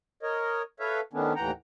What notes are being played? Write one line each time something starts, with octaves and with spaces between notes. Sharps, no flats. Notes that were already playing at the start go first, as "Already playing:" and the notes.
A#4 C#5 D#5
A4 B4 C#5 E5 F5
D#3 A3 B3 C#4 D4
D#2 A2 E3 F#5 G5 A#5